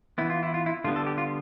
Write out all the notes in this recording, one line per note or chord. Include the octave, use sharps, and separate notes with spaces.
E3 B3 E4
F4
E4
F4
E4
D3 G3 B3 F4
A4
G4
F4